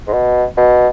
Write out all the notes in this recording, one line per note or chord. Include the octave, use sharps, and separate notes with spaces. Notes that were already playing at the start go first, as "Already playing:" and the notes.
G#2
B2
B2